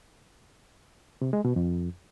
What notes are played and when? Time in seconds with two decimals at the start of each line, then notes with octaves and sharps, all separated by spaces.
1.21 C3
1.33 G#3
1.45 B2
1.56 F2